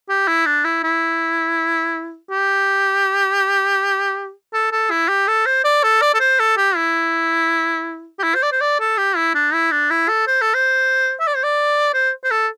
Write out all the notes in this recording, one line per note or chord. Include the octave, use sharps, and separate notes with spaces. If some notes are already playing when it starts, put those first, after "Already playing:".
G4
E4
D4
E4
E4
G4
A4
A4
E4
G4
A4
C5
D5
A4
D5
A4
C5
A4
G4
E4
G4
E4
C5
D5
C5
D5
A4
G4
E4
D4
E4
D4
E4
A4
C5
A4
C5
E5
D5
C5
D5
C5
C5
A4